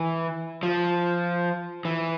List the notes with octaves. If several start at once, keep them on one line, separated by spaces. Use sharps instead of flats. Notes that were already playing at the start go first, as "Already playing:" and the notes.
Already playing: E3
F3
E3